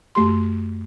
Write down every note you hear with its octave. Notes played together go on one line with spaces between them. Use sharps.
F#2 A3 G4 C6